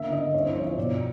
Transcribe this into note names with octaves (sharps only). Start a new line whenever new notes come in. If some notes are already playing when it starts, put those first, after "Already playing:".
Already playing: D3 A#3 E5
D3 D#5
C2 C#5
C5
F3 C#5
C#5
B2 D5